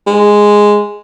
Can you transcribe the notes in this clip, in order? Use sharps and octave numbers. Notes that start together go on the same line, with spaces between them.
G#3